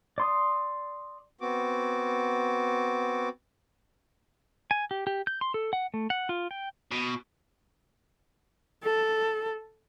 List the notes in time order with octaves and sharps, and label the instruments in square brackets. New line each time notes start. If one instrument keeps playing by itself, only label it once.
[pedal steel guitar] D5 C6 D#6
[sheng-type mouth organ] B3 C4 F#4 D6
[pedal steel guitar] G#5
G4
G4
G6
C6
A4
F#5
A3
F#5
F4
G5
[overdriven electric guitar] B2
[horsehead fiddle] A4